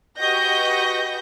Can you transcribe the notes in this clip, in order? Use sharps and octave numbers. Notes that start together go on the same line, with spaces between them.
F#4 G4 B4 D#5 G6 A#6